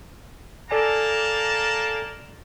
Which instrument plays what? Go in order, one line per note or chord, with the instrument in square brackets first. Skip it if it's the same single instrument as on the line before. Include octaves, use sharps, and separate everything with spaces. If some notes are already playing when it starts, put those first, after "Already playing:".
[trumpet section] A#3 A#4 A5 [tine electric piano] A4 D5 G#5